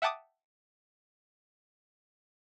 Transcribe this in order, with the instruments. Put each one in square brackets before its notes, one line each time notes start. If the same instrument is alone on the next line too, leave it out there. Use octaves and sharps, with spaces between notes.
[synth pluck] E5 F#5 G5 A5 D6 D#6